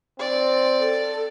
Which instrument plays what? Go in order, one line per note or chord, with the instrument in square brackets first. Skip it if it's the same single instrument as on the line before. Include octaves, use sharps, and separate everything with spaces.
[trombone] C4 [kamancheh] D5
[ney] A4